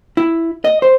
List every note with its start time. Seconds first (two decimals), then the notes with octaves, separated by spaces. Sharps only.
0.17 E4
0.64 D#5
0.82 C5